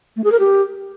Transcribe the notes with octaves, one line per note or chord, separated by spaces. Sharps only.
A3
G#4
A#4
G4